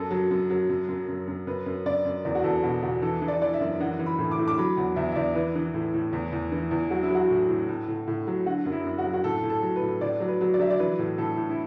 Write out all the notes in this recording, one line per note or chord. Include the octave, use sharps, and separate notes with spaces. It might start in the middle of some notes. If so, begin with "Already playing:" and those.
Already playing: F#2 A4
F#3
F#2
F#3
F#2
F#2
F#2
F#2
F#2 B4
F#2
F#2 D5
F#2
E2 D5
F#4
E2 A4
B2 F#4
E2 F#4
E3 A4
E3
D5
E3 D5
E5
F#2
E3 F#5
E3
B5
A2
D6
A2
D6
F#3 B5
E2 F#5
E2 E5
E5
E2 D5
E3 B4
E3
A2
A2
E2
E2
E3
E2
F#3 F#4
E4
F#3 F#4
A2
A2
A2
A2
A2
F#3
D3 F#4
F#2
E4
F#2
F#4
F#3
F#4
A2 A4
A2
A4
F#3
B4
A2
A2 D5
F#3
B4
F#3
D5
F#3 E5
D5
E3 B4
A2
A2 A4
A2
E4